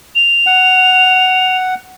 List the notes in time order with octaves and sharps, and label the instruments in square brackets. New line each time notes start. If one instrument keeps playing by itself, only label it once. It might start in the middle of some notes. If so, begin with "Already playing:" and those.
[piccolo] F7
[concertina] F#5